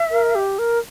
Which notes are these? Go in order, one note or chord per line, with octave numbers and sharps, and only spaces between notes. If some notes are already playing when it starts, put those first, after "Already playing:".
Already playing: E5
A#4
G4
A#4